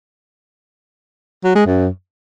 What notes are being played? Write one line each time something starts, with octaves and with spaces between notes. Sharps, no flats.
F#3
G#3
F#2